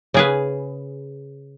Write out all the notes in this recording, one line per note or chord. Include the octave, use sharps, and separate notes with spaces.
C#3 G#4 B4